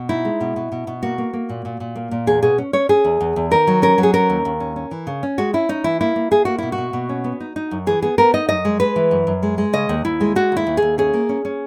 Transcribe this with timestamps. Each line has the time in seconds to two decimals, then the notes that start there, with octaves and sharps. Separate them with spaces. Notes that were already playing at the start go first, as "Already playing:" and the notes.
Already playing: B2
0.09 D#4 E4
0.25 G#3
0.41 B2
0.56 B2
0.72 B2
0.87 B2
1.02 A#3 F#4
1.18 A#3
1.33 A#3
1.49 A#2
1.65 A#2
1.80 A#2
1.96 A#3
2.11 A#2
2.27 E2 G#4
2.43 B2 G#4
2.58 C#4
2.73 C#4 C#5
2.89 C#4 G#4
3.04 E2
3.21 E2
3.36 E2
3.51 D#3 A#4
3.67 F#3
3.82 C#4 A#4
3.98 F#3
4.03 G#4
4.14 C#4 A#4
4.30 D#2
4.45 D#2
4.60 C#4
4.76 C#4
4.91 E3
5.07 C#3
5.23 C#4
5.38 G#3 F#4
5.53 C#4 E4
5.69 C#4 D#4
5.84 E3 E4
6.01 A#3 E4
6.16 A#3
6.31 A#3 G#4
6.45 A#3 F#4
6.58 B2 E4
6.72 F#4
6.78 B2
6.93 B2
7.09 C#4
7.24 B3
7.40 D#4
7.56 D#4
7.71 F#2
7.87 E3 G#4
8.02 B3 G#4
8.18 B3 A#4
8.34 D#4 D#5
8.49 F#2 D#5
8.65 G#3
8.80 G#3 B4
8.96 E3
9.11 F#2
9.27 F#2
9.43 G#3
9.58 G#3
9.73 C#3 D#5
9.89 D#2
10.05 D#2 E4
10.21 G#3
10.35 G#3 F#4
10.52 D#2 E4
10.67 D#2
10.77 D#2 G#4
10.98 C#4 G#4
11.14 A#3
11.29 C#4
11.45 C#4